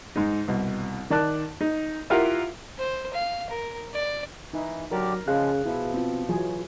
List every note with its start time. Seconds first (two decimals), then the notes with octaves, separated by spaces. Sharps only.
0.16 G#2 D#4
0.48 C2 B2
1.10 D#3 D5 A5 F#6
1.61 D#4
2.10 E4 F4 G4 A#4 F5 F#5
2.79 C5
3.13 F5
3.49 A#4
3.94 D5
4.53 E3 D#4
4.91 D3 F#3 G4 A#4 D5
5.28 C#3 F3 G#3 G#4 F5 F#6
5.65 B2 F3 E4
5.94 C4 F4
6.29 E3 F#3 F4 G#4